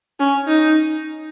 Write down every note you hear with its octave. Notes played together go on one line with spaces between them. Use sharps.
C#4
D#4